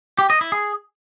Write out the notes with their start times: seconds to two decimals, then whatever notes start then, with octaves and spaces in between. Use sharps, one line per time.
0.19 G4
0.30 D#5
0.41 E4
0.52 G#4